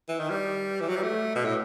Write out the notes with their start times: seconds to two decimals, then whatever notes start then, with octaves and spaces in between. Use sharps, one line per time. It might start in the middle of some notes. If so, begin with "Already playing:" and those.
0.09 E3
0.20 D#3
0.30 G3
0.81 E3
0.88 F#3
0.97 G3
1.03 A3
1.35 B2
1.45 A2